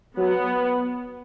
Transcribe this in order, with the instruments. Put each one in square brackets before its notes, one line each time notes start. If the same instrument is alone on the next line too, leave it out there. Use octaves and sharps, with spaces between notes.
[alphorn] F#3 [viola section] B3